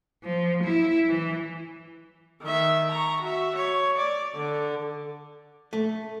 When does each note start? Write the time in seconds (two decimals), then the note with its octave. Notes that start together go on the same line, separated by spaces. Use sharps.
0.24 F3
0.63 E4
1.08 E3
2.43 D#3 E5
2.91 A#5 C#6
3.21 F#4 E5
3.56 C#5
3.98 D5
4.35 D3
5.73 A3